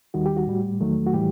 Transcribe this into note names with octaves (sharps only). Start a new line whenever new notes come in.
D#2 D#3 G3 F#4
G4
F#4
A2 G3
E2 D#3 F#3 A3
F#4
A2 E3 G3 G4